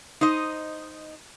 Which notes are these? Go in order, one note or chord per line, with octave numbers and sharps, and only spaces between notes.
D#4 C5 D#5